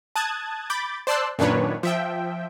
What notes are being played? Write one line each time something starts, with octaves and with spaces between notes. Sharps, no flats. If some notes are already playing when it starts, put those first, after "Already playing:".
A5 D#6 F#6 G#6 A6
B5 D6 G6 A6
C5 D5 A5 C6 E6 F#6
F#2 A#2 D#3 D4 B4 C#5
F3 E5 G5